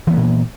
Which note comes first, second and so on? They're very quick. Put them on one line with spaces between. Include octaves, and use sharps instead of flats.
E3 B3 A#3 A#2